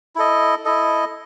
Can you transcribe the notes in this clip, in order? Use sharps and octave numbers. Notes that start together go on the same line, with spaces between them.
E4 A4 D#5
E4 A4 D#5